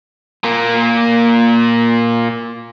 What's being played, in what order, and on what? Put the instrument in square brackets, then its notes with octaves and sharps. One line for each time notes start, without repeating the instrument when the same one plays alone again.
[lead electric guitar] A#2 A#3